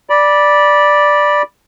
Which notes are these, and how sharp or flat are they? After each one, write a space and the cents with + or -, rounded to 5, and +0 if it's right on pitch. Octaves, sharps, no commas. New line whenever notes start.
D5 +0 B5 -20